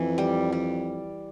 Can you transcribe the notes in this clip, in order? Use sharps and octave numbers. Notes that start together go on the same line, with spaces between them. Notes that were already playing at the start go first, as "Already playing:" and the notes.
Already playing: F2 E3
G3
G3